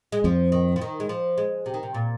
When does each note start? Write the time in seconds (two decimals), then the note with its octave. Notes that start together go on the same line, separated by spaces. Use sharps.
0.12 G#3
0.24 F2 F3
0.52 D#3
0.76 F3
0.81 D#3
1.00 G#3
1.09 F3
1.37 G#3
1.66 C3
1.74 D#3
1.83 C3
1.94 A#2